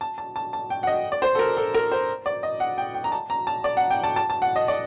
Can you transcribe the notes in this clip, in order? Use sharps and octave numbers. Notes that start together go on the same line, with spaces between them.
A5
A5
A5
A5
G5
F#5
D#5
D5
C5
A4
A#4
A4
A#4
C5
D5
D#5
F#5
G5
G5
A#5
A5
A#5
A5
D5
F#5
G5
A5
A5
A5
F#5
D#5
D5